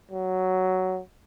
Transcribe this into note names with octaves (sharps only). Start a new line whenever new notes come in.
F#3